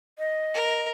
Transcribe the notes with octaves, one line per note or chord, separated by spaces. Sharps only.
D#5
A#4